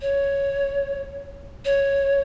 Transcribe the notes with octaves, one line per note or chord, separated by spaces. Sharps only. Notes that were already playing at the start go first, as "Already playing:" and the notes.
C#5
C#5